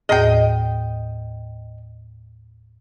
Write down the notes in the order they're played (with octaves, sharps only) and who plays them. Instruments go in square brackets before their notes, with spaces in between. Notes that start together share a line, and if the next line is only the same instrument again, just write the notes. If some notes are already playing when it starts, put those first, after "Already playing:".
[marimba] D#2 A2 G#4 [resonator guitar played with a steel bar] D#5 G5